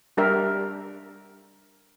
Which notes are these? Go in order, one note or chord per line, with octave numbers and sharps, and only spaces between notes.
G3 D4 G4 A#4 E5